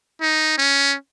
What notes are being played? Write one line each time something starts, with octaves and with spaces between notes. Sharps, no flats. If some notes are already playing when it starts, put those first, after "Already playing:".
D#4
C#4